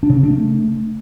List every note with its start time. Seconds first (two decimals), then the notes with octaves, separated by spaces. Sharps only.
0.03 D4
0.10 C#3
0.16 C#4
0.23 D4
0.30 A3